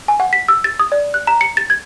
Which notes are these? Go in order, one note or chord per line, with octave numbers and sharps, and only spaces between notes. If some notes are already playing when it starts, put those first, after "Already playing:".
G#5
F#5
B6
E6
A6
D#6
D5
F#6
A#5
C#7
A6
G#6